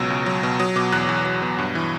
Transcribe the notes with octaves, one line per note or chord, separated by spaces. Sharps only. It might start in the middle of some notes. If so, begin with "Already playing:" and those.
Already playing: C#2 B2 F#3 E6
C#2
F#3
B2
F#3 D#6
B2 D6
E2 F#6
E2
F#3
B2
G2
E3